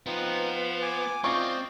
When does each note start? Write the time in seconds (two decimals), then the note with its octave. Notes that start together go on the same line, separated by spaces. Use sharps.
0.06 F3 B3 C4 D#4
0.82 G#5 D6
1.24 C4 F4 D5 D#5 C#6